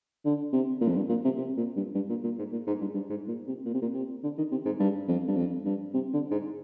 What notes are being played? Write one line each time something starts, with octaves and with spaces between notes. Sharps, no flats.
D3
C3
A#2
F2
G2
A#2
C3
C3
A#2
G2
G2
A#2
A#2
G#2
A#2
G#2
G2
G2
G#2
A#2
C3
A#2
C3
A#2
C3
D3
D#3
C3
G#2
G2
F2
G2
F2
G2
C3
D3
G#2